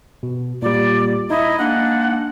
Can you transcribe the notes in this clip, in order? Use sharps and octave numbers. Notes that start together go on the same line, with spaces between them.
B2
A#2 G3 D5
D#4 E4 D#5
G#3 A#3 D4 F#5